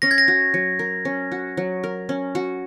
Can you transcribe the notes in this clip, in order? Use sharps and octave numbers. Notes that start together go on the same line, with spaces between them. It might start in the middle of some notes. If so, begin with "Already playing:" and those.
C#4 A#6
G#6
A#6
F#4
F#3
A#4
C#4
F#4
F#3
A#4
C#4
F#4